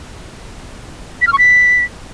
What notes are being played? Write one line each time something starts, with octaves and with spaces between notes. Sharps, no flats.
B6
F6
C#6
B6